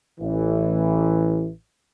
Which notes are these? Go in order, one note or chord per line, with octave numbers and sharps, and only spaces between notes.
A1 E3